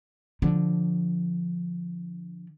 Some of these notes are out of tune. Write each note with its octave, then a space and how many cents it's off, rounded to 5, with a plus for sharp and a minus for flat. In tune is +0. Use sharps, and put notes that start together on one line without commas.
D3 +0 F3 +0